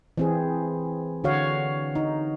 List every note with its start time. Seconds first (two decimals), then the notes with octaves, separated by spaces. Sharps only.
0.18 E3 C4 G#4
1.24 D3 F#4 C#5 F5
1.95 D#4